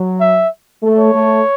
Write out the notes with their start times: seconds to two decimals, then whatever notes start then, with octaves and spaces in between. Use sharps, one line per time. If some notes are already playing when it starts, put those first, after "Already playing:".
Already playing: F#3
0.20 E5
0.83 A3
0.98 C#5
1.14 A3